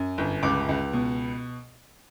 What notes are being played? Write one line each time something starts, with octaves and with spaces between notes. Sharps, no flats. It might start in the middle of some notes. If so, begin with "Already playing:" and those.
Already playing: F#2
G1
C#2 D6
C#2
B2